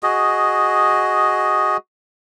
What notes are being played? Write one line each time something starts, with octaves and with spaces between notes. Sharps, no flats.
F#4 G#4 D#5